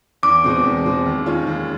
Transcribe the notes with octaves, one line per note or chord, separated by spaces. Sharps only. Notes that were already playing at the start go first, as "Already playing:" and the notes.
E2 D6
B2 G#3 C4
E2
B2 G#3 C4
D#2
D#3 G#3 C#4 F4
D#2